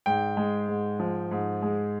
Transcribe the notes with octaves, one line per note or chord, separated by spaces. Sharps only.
G#2 G5
G#3
G#2
F3
G#2
G#3